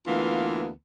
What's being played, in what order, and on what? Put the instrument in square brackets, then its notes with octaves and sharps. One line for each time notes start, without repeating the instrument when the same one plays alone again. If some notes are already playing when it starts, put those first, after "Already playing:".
[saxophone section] D2 E3 A#3 B3 F4